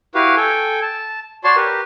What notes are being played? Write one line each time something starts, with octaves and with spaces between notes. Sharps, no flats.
E4 F#4 G4 B4 F5
A4 G5 G#5
A5
F#4 C#5 D5 A5 C6
G4 A#4 B4